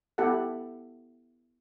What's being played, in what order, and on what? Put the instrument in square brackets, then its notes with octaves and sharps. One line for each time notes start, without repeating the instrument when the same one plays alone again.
[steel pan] B3 E4 G4 A4 E5 F#5